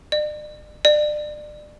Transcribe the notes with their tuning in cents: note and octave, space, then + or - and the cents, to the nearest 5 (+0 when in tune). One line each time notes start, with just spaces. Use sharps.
D5 +40
D5 +30